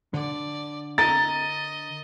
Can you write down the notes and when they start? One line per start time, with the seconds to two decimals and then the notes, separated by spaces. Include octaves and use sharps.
0.14 D3 D5
0.98 A#4 D#5 A6